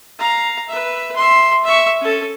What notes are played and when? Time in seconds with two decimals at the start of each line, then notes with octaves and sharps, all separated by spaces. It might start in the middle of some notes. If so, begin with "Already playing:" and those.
0.19 F5 A#5
0.68 B4 E5
1.16 E5 C6
1.64 E5 C#6
2.01 C#4 A4